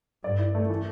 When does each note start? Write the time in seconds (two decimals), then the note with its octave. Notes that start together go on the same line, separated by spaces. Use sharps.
0.24 G2 D5
0.39 E4
0.55 A3
0.69 E3